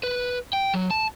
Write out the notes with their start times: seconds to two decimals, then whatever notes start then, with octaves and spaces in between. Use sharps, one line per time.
0.03 B4
0.53 G5
0.74 F#3
0.91 A5